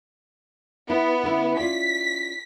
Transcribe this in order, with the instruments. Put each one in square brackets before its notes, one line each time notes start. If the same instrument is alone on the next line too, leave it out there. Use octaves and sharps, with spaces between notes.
[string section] B3 [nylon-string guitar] E4
[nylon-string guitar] D3 C#4 E4
[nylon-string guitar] C#4 F4 D5 [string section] B6